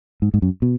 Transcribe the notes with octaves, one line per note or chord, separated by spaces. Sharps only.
G#2
G#2
F#2
B2